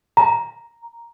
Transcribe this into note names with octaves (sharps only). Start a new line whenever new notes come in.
A#5